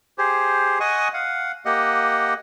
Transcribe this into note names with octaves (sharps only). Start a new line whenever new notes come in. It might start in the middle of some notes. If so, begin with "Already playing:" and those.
G4 G#4 C5
D#5 F#5 G#5 C#6 D#6
F5 F#5
A#3 G4 D#5 F#5